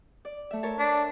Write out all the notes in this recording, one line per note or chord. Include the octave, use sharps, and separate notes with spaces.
D5
A3 E5
A#4 C#5 A5
D4